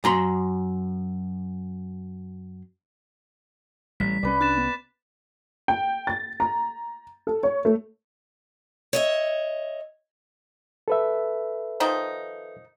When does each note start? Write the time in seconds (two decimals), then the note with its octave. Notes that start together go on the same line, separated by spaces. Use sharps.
0.04 F#2 A#5 C6
4.00 A1 G3 B6
4.23 C2 F3 C#4 B4 D5
4.41 D4 F#6 A6 E7
4.58 B3
5.68 G5
6.07 A6
6.40 A#5
7.27 A4
7.43 C#5
7.65 A3
8.93 C#5 D#5 E5
10.88 A4 B4 E5
11.80 D#3 F3 D#4